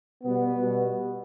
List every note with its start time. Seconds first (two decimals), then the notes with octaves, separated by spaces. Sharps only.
0.23 B2 G3 B3
0.60 B2 G3